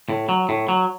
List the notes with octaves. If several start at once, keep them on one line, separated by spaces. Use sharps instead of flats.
A2
F#3
A2
F#3